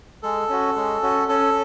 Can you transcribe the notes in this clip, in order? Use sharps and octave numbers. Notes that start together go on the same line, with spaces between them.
G#3 A4
C#4 F#4
G#3
C#4 F#4
C#4 A4